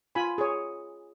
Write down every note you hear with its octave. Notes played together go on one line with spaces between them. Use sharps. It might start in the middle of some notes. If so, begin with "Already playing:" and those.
F4 G#5 B5
G#4 C#5